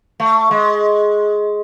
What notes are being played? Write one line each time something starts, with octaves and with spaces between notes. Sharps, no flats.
A3
G#3